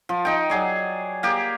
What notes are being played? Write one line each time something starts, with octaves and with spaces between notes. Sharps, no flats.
F3
D#4 G5
F#3 G#4 D5
A#3 G4 G#4